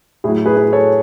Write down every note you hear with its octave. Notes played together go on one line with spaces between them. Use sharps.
A2 F#3 E4 G#4
G#4 B4
G#4 B4
A4 C#5